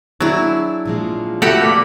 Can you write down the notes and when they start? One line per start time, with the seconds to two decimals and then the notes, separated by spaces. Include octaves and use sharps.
0.21 F#3 D4 E4 G#4
0.85 A#2 F3 G#3
1.42 A3 F#4 G4 A4 F#5 B5
1.61 A#3 B4 D5